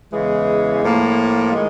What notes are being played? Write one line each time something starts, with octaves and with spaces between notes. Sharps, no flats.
E2 C#3 E3 G#3
A2 F3 A#3
D#3 G#3